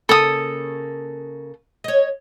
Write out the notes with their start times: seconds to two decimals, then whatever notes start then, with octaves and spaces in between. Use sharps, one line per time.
0.09 C#3 A#3 A4 D#6
1.84 C#5 D#5